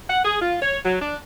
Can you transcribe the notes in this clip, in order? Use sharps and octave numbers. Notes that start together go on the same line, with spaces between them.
F#5
G#4
F4
C#5
F#3
D4